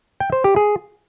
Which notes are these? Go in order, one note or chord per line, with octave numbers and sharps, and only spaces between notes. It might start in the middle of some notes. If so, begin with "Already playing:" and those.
G5
C5
G4
G#4